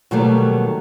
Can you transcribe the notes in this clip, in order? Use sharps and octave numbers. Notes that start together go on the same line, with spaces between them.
B2 D#3 F#3 G3 A3 A#3